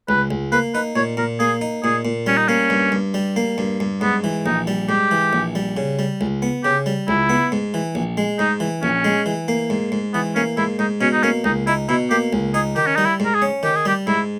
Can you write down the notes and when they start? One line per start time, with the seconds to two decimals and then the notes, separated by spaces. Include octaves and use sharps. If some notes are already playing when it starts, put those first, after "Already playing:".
0.09 C#2 B4
0.31 C#2
0.52 A#3 B4
0.74 D#4 B4
0.96 A#2 C#5
1.17 A#2 A#4
1.39 A#3 G#4
1.61 D#4
1.84 A#2 G#4
2.05 A#2
2.26 G3 C#4
2.38 D#4
2.48 A#3 C#4
2.70 G2
2.92 G2
3.14 G3
3.36 A#3
3.58 G2
3.80 G2
4.01 G#2 B3
4.24 E3
4.46 A#1 D#4
4.67 G3
4.89 G#2 G4
5.11 E3
5.33 A#1
5.55 G3
5.77 C#3
5.99 G3
6.21 C#2
6.42 B3
6.64 C#3 G4
6.86 G3
7.08 C#2 E4
7.29 B3
7.52 G#2
7.74 E3
7.95 A#1
8.17 G#3
8.39 G#2 D#4
8.60 E3
8.82 A#1 C#4
9.04 G#3
9.26 E3
9.48 A#3
9.70 G#2
9.92 G#2
10.14 E3 B3
10.35 A#3 C#4
10.57 G#2 E4
10.79 G#2 D#4
11.01 B2 C#4
11.13 D#4
11.23 A#3 C#4
11.44 C#2 D#4
11.67 D#4 E4
11.89 B2 E4
12.10 A#3 G4
12.33 C#2
12.54 D#4 G#4
12.76 D#3 G4
12.86 C#4
12.96 G3 D#4
13.05 E4
13.20 G#2
13.25 A#4
13.35 G#4
13.42 C#4
13.63 D#3 G4
13.76 G#4
13.85 G3 G4
14.07 G#2 E4